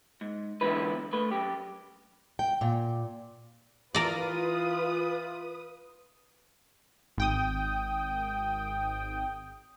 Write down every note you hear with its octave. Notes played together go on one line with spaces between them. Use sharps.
G#2
E2 G#2 D3 E3 B4
A3 B4
F#2 G4
G5
A#2
E3 F4 A#4 B4 D5 D#6
G#1 G5 D#6